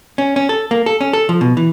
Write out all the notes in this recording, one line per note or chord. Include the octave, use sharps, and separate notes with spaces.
C#4
C#4
A4
A#3
A4
C#4
A4
F3
B2
E3